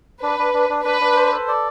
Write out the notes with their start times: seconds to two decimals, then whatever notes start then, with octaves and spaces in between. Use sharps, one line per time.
0.23 D4 B4
0.39 D4
0.54 D4
0.70 D4
0.85 D4 B4
1.01 D4
1.16 C5
1.32 A4
1.48 D5